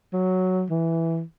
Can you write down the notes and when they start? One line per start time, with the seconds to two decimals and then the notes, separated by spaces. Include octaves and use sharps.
0.13 F#3
0.70 E3